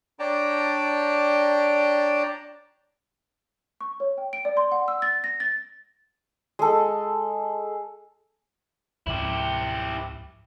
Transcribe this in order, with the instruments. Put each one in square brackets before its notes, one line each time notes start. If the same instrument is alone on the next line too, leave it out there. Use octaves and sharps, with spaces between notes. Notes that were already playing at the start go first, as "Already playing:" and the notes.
[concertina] D4 C#5 D5 G5 A5 A#5
[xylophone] C#6
C#5
G5
D7
D5
C6
F#5
E6
A6
A#6
A6
[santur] G#3 A4
[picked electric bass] C#2 G#2 F3 [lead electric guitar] E4 G4